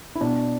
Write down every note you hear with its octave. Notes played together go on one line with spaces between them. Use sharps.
E4
B2 D4